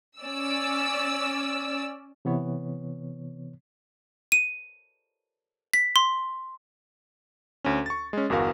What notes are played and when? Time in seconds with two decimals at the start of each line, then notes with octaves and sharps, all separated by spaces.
0.21 C#4 D5 E6
2.25 C3 E3 B3 C#5
4.32 D#7
5.74 B6
5.96 C6
7.65 D2 C#4
7.86 C#6 A6
8.13 G#3 C#4
8.30 G1 E2 F#4 A#4 F5